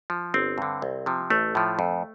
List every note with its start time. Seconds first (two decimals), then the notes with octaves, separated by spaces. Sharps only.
0.10 F3
0.34 G1 C4
0.58 G2 D3
0.82 C2
1.06 C3 F3
1.30 A1 A3
1.55 A2 F3
1.79 F2